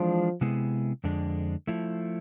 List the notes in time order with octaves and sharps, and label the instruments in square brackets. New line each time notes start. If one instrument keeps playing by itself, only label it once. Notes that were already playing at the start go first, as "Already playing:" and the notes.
Already playing: [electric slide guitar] E3 G#3 D4 [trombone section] F3
[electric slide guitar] C3 G#3 B3 E4 G#4
F2 D3 G#3 D4
F3 A3 E4